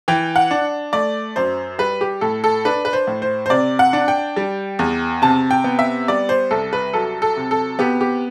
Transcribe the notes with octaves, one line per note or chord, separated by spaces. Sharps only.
E3 G5
F#5
D4
A3 D5
F#2 C5
G3 B4
G4
A2 A4
A4
D4 B4
B4
C5
A2
C5
C5
C3 D5
F#5
D4
G5
G3
E2
C3 A5
G5
B3
E5
G3 D5
C5
C2 A4
B4
F#3 A4
A4
C3
A4
B3 G4
G4